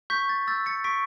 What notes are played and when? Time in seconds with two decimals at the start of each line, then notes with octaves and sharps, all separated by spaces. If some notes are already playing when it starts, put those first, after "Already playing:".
0.10 C#6 G6 B6
0.29 A6
0.47 E6 G6 A6
0.66 A6 C#7
0.84 C#6 B6 D7